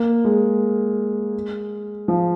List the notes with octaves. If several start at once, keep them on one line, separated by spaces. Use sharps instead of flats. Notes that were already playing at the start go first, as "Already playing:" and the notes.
Already playing: A#3
G#3
F3